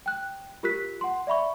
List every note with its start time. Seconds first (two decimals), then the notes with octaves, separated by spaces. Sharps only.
0.06 G5 F#6
0.63 F4 G4 A#4 F#6 B6
1.01 F#5 C6
1.27 D5 E5 B5 C#6